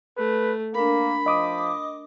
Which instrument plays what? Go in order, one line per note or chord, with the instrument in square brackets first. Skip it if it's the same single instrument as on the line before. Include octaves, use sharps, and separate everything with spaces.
[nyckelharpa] A3 [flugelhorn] B4
[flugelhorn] A#3 [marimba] D4 A#4 [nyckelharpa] B5
[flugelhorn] F3 [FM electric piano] D#5 D6 D#6